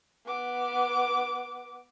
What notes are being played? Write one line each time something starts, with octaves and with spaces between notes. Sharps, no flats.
B3 D6